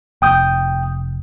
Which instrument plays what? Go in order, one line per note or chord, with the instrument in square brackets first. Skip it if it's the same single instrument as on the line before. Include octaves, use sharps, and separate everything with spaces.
[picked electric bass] F1 [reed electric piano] G5 D#6 G6